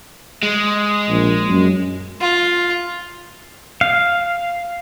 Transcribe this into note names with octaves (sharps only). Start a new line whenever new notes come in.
G#3
A#1
F#2
F4
F5